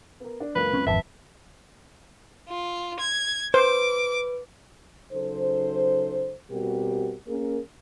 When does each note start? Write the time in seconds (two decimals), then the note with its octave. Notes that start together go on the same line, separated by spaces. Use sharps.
0.20 B3 A#4
0.40 D4
0.55 C#2 F#2 A#3 B4
0.74 C4 C#4
0.87 G#1 F2 B4 E5 A5
2.49 F4
2.99 G#6
3.54 B4 C5 D6
5.13 C#3 F#3 D#4 A4 C5
6.51 B2 G3 C4 F#4 G4 A#4
7.28 A#3 C#4 G#4 A#4